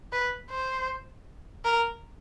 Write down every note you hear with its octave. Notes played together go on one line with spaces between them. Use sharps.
B4
C5
A#4